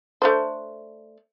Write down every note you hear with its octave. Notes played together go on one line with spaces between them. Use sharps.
A3 D4 C5